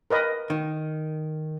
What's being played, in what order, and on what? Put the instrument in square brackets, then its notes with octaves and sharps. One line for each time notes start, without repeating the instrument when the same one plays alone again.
[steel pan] A#4 B4 D#5
[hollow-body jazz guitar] D#3